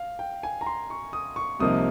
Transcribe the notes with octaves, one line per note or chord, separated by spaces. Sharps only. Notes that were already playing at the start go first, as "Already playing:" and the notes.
Already playing: F5
G5
G#5
A#5
C6
C#6
D#6
C#6
C2 C3 F3 A#3 D#4 D#6